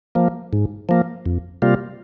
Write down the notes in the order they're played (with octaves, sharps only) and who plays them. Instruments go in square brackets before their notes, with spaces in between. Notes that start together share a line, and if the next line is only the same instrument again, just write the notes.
[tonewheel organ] F3 A#3
G#2
F3 A#3
F2
C3 G3 A#3 F4